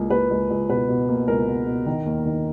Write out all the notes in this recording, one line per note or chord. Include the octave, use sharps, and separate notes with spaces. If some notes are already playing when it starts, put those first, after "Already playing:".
Already playing: C#2 A#3
A#3 B4
C#2
C#2
B2 B4
B2
A#3
C#2 A#4
B2
B2
D#3
D#2
D#3